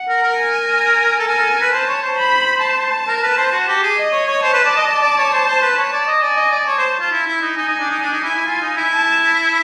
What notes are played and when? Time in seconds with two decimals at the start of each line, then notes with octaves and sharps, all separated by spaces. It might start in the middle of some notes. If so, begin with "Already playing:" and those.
Already playing: F#5
0.09 A#4
0.23 A#4
0.38 G#5
1.19 A4
1.28 A#4 G#5
1.39 A4
1.50 A#4
1.61 B4
1.73 C5 A5
1.88 C#5
2.03 C5
2.18 B5
2.62 A5
3.07 A#4
3.22 B4
3.37 C5
3.52 F#4
3.68 G4
3.83 G#4
3.97 D#5
4.12 C#5
4.27 C#5
4.43 C5 A5
4.54 B4
4.65 D5
4.77 D#5
4.87 D5
5.02 D5
5.17 C#5
5.32 C5
5.47 C5
5.62 B4
5.77 C#5
5.92 D5
6.07 D#5
6.22 D5 G#5
6.37 D#5
6.52 D5
6.67 C#5 A5
6.78 C5
7.00 F4
7.12 E4
7.27 E4
7.42 D#4
7.57 D#4 G#5
7.68 D#4
7.80 D4
7.91 D#4
8.01 D4 G#5
8.13 D#4
8.24 E4
8.36 E4
8.46 F4
8.62 D#4
8.77 E4
8.92 A5